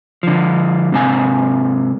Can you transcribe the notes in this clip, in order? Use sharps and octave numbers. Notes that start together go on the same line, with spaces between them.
D3 F3
G#2 C3 G#5